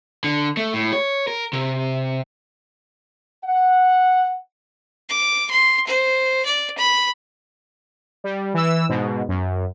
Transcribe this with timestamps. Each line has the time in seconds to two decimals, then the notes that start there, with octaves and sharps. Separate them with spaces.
0.24 D3
0.57 A3
0.73 A2
0.93 C#5
1.28 A#4
1.53 C3
3.45 F#5
5.10 D6
5.51 C6
5.87 C5
6.45 D5
6.78 B5
8.24 G3
8.54 E3 E6
8.89 G#2 B2
9.28 F#2